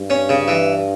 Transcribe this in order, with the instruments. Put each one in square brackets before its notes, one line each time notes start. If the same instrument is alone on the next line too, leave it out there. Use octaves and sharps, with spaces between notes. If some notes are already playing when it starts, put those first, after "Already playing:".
Already playing: [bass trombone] G2
[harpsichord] C#4
C#3
E3